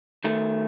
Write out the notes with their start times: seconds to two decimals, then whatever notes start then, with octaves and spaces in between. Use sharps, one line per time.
0.24 D#3 A3